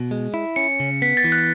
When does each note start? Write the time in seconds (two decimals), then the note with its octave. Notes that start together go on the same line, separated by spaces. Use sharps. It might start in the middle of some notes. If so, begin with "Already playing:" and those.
Already playing: B2
0.11 G#3
0.34 E4
0.56 C#4 C#7
0.80 C#3
1.02 B3 B6
1.17 A6
1.24 E3
1.32 F#6